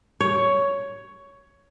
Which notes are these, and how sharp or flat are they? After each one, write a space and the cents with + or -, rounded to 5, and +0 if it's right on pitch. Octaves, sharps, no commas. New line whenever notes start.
C#5 +10